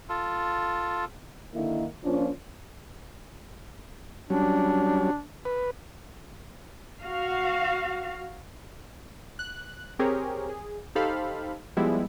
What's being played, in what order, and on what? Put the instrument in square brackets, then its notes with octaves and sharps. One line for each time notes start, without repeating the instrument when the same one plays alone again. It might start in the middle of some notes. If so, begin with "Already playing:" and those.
[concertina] F4 A4
[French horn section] D3 D#3 A#3 D#4 E4
F3 A#3 C#4 D4 F4
[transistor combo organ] F#3 G3 C#4 [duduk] D4
[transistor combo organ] B4
[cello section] F#4 F5
[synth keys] F#6
C4 G4 G#4 A#4 C#5
G#4
D#4 G4 A4 C5 F5 B5
F3 G3 G#3 B3 E4